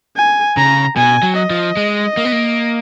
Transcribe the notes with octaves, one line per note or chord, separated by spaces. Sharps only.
G#5
C#3 A#5
B2 G#5
F#3
D#5
F3
G#3
A#3
B3
A#3